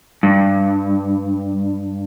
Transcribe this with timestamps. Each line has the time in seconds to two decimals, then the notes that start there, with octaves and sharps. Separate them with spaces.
0.23 G2